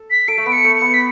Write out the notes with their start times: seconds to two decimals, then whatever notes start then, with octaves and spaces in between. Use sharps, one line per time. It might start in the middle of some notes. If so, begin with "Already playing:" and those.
Already playing: A4
0.11 B6
0.28 A4 D7
0.37 A3
0.46 B3 D7
0.52 C#7
0.64 A3
0.76 C#7
0.81 B3
0.94 B6